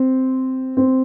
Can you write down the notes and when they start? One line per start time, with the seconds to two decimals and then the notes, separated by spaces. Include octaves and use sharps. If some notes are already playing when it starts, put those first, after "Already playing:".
Already playing: C4
0.77 C4